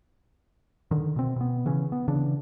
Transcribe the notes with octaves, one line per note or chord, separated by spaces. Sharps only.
D3 D#3
B2 C4
B2 B3
C#3 E3 C#4
B3
C#3 E3 D4